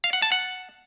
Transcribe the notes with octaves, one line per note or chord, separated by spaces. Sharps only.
F5
F#5
A5
F#5